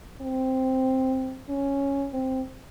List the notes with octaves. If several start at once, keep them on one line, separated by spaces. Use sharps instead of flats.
C4
C#4
C4